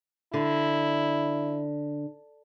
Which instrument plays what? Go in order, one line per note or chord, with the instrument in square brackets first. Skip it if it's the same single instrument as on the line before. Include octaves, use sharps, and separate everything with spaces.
[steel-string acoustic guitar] D3 [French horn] E4